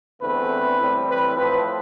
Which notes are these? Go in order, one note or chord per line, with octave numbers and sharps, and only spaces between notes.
E2 D3 A3 C4 B4
A2 E3 G3 C4
B4
A2 F3 C4 B4